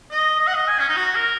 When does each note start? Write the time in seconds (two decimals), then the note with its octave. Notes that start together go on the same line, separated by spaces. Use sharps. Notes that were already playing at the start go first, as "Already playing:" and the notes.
0.11 D#5
0.39 D#5
0.47 F#5
0.54 D#5
0.68 G#5
0.79 C#4
0.88 D#4
0.96 F#4
1.15 A#4